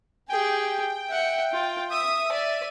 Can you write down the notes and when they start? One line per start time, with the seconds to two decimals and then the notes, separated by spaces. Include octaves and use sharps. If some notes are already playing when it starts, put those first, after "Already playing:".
0.30 G4 G#4 G5
1.09 E5 F#5
1.53 F4
1.91 E5 D#6 D#7
2.32 D5